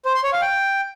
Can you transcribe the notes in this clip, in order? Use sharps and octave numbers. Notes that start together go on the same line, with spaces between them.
C5
C6
C#5
F5
G5